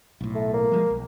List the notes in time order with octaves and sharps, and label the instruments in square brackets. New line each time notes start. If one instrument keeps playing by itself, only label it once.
[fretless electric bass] B1 A2
[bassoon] A3
A#3
[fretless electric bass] F3 G3 G#3
E1 B1